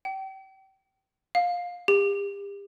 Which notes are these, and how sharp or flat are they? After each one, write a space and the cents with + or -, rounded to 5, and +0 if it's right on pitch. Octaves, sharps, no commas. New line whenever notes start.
G5 -30
F5 +20
G4 +40